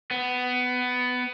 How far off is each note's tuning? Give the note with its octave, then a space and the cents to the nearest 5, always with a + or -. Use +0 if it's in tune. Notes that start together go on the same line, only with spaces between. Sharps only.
B3 +15